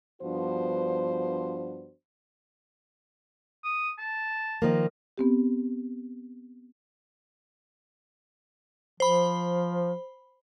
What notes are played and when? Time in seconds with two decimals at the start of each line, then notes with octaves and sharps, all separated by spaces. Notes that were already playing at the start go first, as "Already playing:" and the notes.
0.22 G2 F3 B3 D4 F#4 C5
3.64 D#6
3.98 A5
4.62 D#3 F3 A#3
5.18 B3 C4 G4
9.00 F3 C5 B5